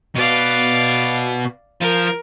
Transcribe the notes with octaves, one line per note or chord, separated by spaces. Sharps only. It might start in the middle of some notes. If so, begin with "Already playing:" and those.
B2 B3 D5 F5
F3 A#4